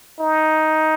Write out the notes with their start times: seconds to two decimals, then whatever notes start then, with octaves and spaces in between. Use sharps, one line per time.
0.20 D#4